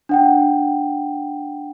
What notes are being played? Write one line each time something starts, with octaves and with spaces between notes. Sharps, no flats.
D4 F#5 G5